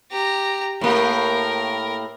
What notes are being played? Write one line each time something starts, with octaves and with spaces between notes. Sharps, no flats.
G4 A#5
A2 A#3 G4 A#4